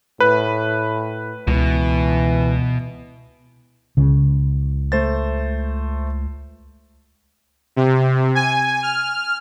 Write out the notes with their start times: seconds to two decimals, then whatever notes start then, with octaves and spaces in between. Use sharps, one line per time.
0.20 A2 B4
1.47 C#2 B2 E3
3.97 C#2 C#3
4.92 A3 C5 A6
7.76 C3
8.35 G#5
8.83 F6